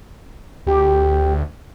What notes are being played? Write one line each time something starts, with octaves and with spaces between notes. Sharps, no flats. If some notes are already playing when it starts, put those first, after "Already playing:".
D2 G4